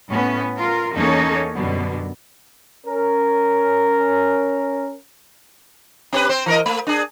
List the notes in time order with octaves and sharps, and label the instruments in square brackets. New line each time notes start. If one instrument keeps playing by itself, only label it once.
[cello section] A2 B3 C#4
F4 A#4
E2 A#3 C#4 D#4 A4 C#5
F#2 B2 D3 G3 B3
[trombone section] C#4 A#4
[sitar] C4 G4 B4
C4 C5
E3 A#4 D#5
A3
D4 G#4